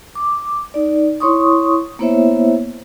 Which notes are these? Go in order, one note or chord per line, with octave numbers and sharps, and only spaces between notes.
D6
D#4 D5
E4 C#5 C6 C#6 D#6
A#3 B3 E4 C5 C#5 E5